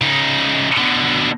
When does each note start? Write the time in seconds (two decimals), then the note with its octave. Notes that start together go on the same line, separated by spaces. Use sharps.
0.01 C#3 D#4
0.77 B2 D3